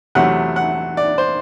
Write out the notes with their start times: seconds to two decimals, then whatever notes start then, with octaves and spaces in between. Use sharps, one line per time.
0.15 E2 C3 F#3 A3 F#5
0.56 F#5
0.97 D5
1.18 C5